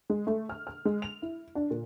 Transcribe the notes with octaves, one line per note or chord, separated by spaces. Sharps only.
G#3
A3
F6
F6
G#3
F7
E4
D4
A#2